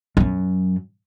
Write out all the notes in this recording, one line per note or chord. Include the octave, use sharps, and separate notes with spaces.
F#2 F#3